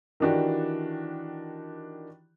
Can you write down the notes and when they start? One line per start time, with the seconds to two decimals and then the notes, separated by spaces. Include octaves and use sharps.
0.20 D#3 E3 D4 F#4 G4